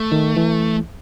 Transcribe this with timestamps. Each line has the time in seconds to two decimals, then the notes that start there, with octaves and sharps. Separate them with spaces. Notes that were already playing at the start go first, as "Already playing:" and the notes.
Already playing: A3
0.12 D#3
0.37 E3